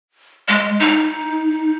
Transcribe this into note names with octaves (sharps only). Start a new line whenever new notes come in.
G#3
D#4